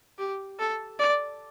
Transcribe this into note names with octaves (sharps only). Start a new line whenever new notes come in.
G4
A4
D5